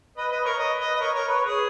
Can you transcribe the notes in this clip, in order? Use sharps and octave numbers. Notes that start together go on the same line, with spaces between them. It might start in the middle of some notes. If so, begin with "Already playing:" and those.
B4 D#5
B4 D#5
A#4 C#5
B4 D#5
B4 D#5
D#5
A#4 C#5
A#4 C#5
B4
C#5
G#4 B4